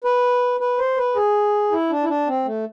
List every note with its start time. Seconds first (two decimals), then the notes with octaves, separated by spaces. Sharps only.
0.04 B4
0.60 B4
0.79 C5
0.97 B4
1.16 G#4
1.71 E4
1.90 D4
2.03 E4
2.09 D4
2.27 C4
2.46 A3